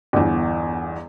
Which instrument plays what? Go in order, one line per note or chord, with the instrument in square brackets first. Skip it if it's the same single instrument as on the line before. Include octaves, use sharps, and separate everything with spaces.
[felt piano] G1 E2